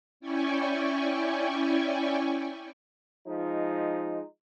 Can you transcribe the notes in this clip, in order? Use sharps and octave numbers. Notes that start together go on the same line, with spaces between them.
C#4 E4 D5 G5 G#5 C#6
F3 G#3 D#4